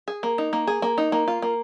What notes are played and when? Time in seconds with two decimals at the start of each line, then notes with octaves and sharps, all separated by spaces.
0.08 G#4
0.23 A#3
0.38 D#4
0.53 A#3
0.67 G#4
0.82 A#3
0.98 D#4
1.12 A#3
1.28 F4
1.42 A#3